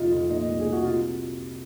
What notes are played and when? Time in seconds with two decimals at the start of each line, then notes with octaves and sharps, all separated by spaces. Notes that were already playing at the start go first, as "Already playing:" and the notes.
Already playing: F2 C3 D#4 F4
0.12 F2
0.30 A#2 D#4
0.47 C2
0.60 G#4
0.66 C2
0.72 F#4
0.84 C3 F4